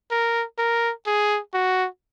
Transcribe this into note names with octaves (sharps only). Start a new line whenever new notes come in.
A#4
A#4
G#4
F#4